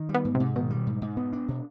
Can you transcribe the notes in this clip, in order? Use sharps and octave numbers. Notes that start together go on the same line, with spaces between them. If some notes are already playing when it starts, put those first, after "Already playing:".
Already playing: D#3
G3
B3
G#2
C3
G#2
B2 D#3
G3
G#2
G#2
B3
D4
B2